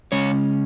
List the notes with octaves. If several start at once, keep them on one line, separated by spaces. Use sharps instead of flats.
C#3 G#3 C#4 C#5